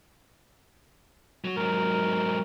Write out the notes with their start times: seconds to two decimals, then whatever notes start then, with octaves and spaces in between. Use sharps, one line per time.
1.44 F#3 F#4
1.56 G#2 F#3 A#4